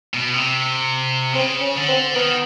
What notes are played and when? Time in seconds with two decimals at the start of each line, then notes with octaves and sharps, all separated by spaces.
0.14 B2
0.34 C3
1.34 C#3 C4
1.61 C#4
1.75 D3
1.88 C4
2.15 D#3 B3